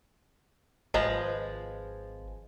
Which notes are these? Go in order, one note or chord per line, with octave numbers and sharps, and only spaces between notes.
G#1 F3 G#3 B4